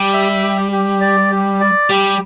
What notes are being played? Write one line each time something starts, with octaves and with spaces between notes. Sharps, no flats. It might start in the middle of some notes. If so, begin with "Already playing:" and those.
Already playing: G3 G4
E5
G4
G4
D5
G4
D5
G3 G4